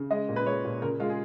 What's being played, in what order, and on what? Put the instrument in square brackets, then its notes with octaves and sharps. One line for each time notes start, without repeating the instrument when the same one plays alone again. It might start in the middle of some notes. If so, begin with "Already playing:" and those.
Already playing: [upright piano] C#3
G#3 D#5
A#2
B4
G#3 C#5
A#2
C#3 A#4
G#3 F4
G#4